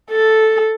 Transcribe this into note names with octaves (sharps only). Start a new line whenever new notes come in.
A4